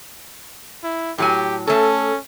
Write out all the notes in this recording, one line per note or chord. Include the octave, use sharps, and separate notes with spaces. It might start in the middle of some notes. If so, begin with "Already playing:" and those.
E4
A2 F#3 G4 G#5
A3 C#4 A4